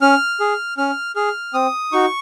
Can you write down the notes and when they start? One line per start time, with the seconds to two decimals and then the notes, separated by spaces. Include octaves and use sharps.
0.01 C#4 F6
0.40 G#4
0.78 C#4 F6
1.16 G#4 F6
1.54 C4 D#6
1.92 D#4 F#4 C#6